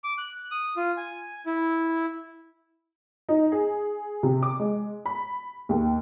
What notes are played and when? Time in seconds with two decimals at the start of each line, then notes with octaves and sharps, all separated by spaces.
0.04 D6
0.18 F#6
0.51 D#6
0.77 F4
0.97 G#5
1.46 E4
3.29 D#4
3.52 G#4
4.23 C3
4.43 D6
4.60 G#3
5.06 B5
5.69 D#2